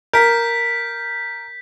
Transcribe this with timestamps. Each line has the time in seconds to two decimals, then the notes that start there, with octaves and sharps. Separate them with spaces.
0.13 A#4 G6 B6